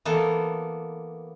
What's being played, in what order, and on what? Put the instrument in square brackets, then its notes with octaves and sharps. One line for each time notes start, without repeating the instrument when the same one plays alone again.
[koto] E3 A#3 B3 A4